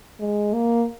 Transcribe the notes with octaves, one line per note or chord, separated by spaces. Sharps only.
G#3
A#3